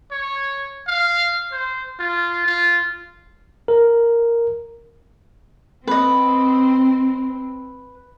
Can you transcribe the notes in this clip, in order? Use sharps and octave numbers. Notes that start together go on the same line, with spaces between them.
C#5
F5
C5
F4
F4
A#4
C4 B4 D#5